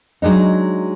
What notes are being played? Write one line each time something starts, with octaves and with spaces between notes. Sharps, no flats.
F#3 G#3 D4 D#4